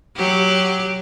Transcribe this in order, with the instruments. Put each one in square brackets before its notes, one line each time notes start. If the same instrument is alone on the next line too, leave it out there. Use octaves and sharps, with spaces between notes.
[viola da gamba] F#3 G4